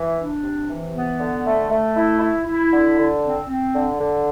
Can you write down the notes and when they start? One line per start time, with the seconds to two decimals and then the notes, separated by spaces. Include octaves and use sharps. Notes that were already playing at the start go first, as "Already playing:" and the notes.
Already playing: E3
0.17 D4
0.43 C3
0.68 E3
0.95 B3
1.19 D3
1.45 A3
1.70 A3
1.96 E4
2.21 E4
2.47 E4
2.72 D3
2.98 D3
3.23 C4
3.48 C4
3.75 D3
3.99 D3